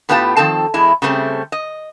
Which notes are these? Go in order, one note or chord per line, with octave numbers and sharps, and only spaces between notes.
A2 B3 F4 G4 B4 A5
D#3 F3 C4 A4 A5
E2 G#3 E4
C#3 G3 A3 A#3 C4
D#5